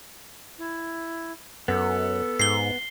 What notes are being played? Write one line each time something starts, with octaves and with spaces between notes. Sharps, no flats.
E4
F#2 B3 A4
G#2 C7 G7